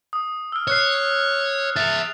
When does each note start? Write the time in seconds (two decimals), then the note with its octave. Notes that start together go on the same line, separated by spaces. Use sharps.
0.13 D#6
0.52 E6 F6
0.67 C#5 F6 F#6 C7
1.76 G#4 E5 A6 F7